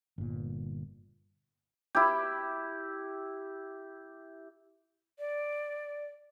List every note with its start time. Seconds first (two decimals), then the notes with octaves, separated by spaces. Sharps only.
0.18 G1 A#2
1.95 E4 G4
5.19 D5